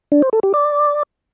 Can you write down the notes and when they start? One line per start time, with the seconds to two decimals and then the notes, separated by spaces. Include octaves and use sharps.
0.12 D4
0.22 C5
0.33 A4
0.43 G4
0.54 D5